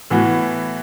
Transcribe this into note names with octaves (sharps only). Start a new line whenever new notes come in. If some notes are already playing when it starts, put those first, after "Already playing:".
A2 E3 B3 F#4